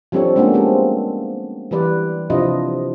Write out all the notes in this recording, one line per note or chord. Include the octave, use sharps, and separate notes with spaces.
F3 G3 C4 D4 A4 C#5
G#3 A#3 B3 C#4 D4
G3 G#3 C4
E3 G3 B4 D5
C3 F3 D4 E4 F4 D#5